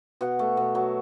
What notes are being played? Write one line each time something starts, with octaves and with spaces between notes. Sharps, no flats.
B2 F#5
A3
B2
F#3